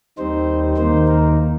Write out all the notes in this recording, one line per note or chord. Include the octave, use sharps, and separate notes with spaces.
D#2 D#3 G3 C4 D#4 C5
D#2 D#3 A#3 D#4 C5
A#4